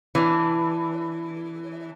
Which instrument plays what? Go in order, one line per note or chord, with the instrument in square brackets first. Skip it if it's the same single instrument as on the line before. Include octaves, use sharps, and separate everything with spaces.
[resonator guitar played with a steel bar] E3 D4